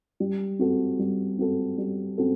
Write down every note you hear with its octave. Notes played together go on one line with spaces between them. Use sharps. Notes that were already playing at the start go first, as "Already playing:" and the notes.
G3
C4 F#4 A4
G3
C4 F#4 A4
G3
C4 F#4 A4